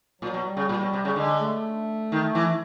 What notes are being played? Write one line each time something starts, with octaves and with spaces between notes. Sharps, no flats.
A#2 F#3
B2
G3
C#3
A#2
B2
C3
C#3
D3 G#3
A3
D#3
E3